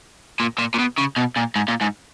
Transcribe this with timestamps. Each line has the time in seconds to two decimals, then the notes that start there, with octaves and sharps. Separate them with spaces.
0.40 A#2
0.58 A#2
0.74 A#2
0.79 B2
0.98 C#3
1.17 B2
1.36 A#2
1.56 G#2
1.68 A#2
1.81 G#2